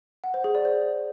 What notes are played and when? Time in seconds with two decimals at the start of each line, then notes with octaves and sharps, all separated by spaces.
0.24 F#5
0.34 C5
0.44 G#4
0.55 D5
0.65 C5